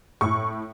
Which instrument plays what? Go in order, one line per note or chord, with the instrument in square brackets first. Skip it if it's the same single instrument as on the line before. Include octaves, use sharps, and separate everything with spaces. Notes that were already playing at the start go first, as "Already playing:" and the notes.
[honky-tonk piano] A2 C#6